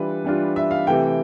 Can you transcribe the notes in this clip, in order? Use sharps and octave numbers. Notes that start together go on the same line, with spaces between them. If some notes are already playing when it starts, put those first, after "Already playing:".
Already playing: E3 G3 D4 F4 B4
E3 G3 D4 F4
E5
F5
C3 E3 A3 E4 G5